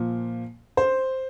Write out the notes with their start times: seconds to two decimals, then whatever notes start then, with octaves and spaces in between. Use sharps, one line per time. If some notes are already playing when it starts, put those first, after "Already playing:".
Already playing: A#2 F3
0.77 C5